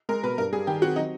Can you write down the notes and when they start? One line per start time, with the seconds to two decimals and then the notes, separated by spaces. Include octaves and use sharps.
0.09 G#3 A#4
0.23 B2 B4
0.38 G2 A#4
0.52 G3 G#4
0.67 D#3 G4
0.81 C4 F#4
0.96 F#3 D#4